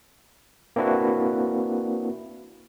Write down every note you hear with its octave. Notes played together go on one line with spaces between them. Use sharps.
A#3 C4 D4 E4 F#4 B4